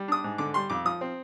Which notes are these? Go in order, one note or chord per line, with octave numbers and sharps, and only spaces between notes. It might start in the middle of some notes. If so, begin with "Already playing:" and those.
Already playing: G3
D4 D#6
G#2
D3 D6
G3 C6
F2 D6
F3 D#6
C4